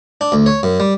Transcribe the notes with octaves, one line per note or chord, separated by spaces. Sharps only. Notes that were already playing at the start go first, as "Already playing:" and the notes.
D4
D2
C#5
F#2
G3